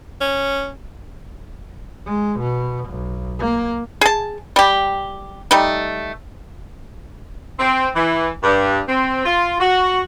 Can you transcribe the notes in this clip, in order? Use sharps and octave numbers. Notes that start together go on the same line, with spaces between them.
C#4
G#3
B2
B1
A#3
G#4 A5
G3 G4
G3 A3 D#4
C4
E3
G2
C4
F4
F#4